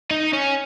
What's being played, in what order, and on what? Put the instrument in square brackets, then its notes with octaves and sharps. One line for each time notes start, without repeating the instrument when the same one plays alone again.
[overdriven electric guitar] D#4
C#4